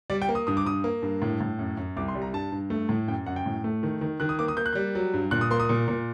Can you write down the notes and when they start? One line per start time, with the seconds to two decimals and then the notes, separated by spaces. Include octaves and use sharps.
0.10 G3 D5
0.22 G5
0.29 A#3
0.35 D#6
0.47 G2 D#6
0.57 D6
0.65 G2 D#6
0.84 A#3
1.02 G2
1.22 A2
1.40 A2
1.59 F#2
1.77 F#2
1.96 C2 D6
2.08 C6
2.15 G3
2.22 A#5
2.33 G2 A5
2.52 G2
2.70 A3
2.89 A2
3.08 F#2 G5
3.26 F#2 F#5
3.36 G5
3.46 A2
3.64 A3
3.83 D#3
4.01 D#3
4.20 D#3 F#6
4.29 D#6
4.39 A#3 D6
4.48 D#6
4.57 A#3 G6
4.66 F#6
4.73 G3 G6
4.95 F#3
5.14 G2
5.31 A#2 F#6
5.41 D#6
5.51 A#3 C6
5.60 D#6
5.69 A#2
5.88 A#2